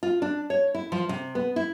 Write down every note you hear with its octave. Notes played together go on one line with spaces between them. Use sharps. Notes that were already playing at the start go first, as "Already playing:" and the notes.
F4
D4
C#5
E4
F3
C3
B3
E4